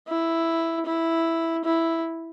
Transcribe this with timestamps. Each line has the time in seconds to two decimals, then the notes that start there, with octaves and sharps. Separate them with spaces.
0.08 E4
0.86 E4
1.65 E4